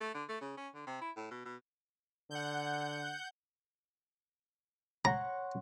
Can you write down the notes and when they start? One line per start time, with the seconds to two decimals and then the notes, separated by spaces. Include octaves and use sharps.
0.01 A3
0.15 D3
0.29 A3
0.41 C#3
0.58 C#4
0.75 D3
0.87 C3
1.01 E4
1.17 A2
1.31 B2
1.46 B2
2.31 D3 F#5 G6
5.05 C#5 F#5 A#5 C6